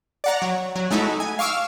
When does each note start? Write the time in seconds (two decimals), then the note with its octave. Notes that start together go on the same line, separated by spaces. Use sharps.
0.24 D5 F#5 A#5
0.42 F#3
0.76 F#3
0.91 G#3 A3 D#4 E4 F#4
1.20 G#5
1.39 F5 C#6 D6 E6 F6